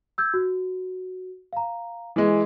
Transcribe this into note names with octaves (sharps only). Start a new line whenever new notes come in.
E6 G6 G#6
F#4
F5 A#5
E3 G#3